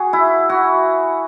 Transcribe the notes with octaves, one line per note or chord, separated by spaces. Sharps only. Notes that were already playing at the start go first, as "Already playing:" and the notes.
Already playing: F#4 G#4
E4
F#4